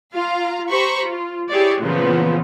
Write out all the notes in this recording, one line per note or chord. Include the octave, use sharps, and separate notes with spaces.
F4 F5 A#5
G4 C5 A#5 B5 C#6
F4
E4 G4 G#4 C#5 D5
A#2 C#3 E3 F3 B3